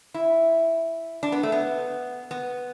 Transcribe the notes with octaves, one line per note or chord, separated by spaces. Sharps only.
E4
D4
B3
A3
B3
B3